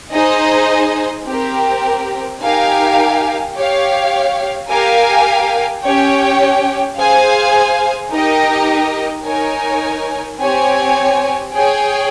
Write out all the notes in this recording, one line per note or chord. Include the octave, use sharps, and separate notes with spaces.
D#4 G#4 C5 D#5
C4 G4 A#4
D#4 G4 A#4 F5 G#5
G4 C#5 F5
G4 A#4 F5 G#5
C#4 G4 C#5 G5
G#4 C5 F5 G#5
D#4 G4 A#4 D#5
D#4 A#4 C#5 G#5
C4 G4 C#5 G#5
G#4 C#5 G5